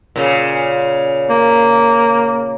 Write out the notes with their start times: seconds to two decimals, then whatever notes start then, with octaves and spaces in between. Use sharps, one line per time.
0.16 A#2 C#3
1.30 A#3